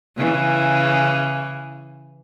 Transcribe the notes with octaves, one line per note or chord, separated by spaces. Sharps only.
C#3 E3